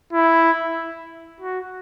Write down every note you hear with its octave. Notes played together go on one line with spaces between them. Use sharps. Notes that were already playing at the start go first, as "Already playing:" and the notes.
E4
F#4